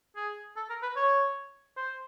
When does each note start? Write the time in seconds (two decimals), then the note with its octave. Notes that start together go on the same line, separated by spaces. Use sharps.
0.16 G#4
0.56 A4
0.70 A#4
0.83 B4
0.96 C#5
1.77 C5